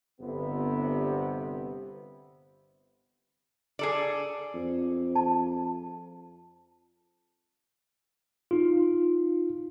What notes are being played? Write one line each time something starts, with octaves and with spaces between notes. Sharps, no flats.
G1 C3 B3
G#4 A4 D5
F2
A5
D#4 F4